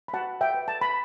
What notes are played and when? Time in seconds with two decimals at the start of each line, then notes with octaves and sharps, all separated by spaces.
0.08 B5
0.14 F#4 F#5 A5
0.41 E5 G5
0.54 B4
0.68 A5
0.81 B5